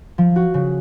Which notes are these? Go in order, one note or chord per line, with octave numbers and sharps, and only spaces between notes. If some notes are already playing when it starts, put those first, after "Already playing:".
F3
F#4
C#3